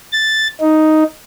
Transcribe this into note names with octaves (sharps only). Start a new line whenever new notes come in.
A6
D#4